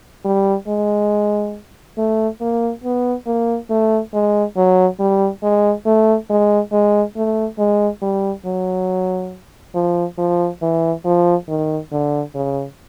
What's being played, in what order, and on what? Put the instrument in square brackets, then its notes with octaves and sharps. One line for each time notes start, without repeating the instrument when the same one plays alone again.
[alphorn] G3
G#3
A3
A#3
B3
A#3
A3
G#3
F#3
G3
G#3
A3
G#3
G#3
A3
G#3
G3
F#3
F3
F3
E3
F3
D#3
D3
C#3